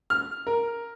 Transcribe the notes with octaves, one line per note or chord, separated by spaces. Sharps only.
F6
A#4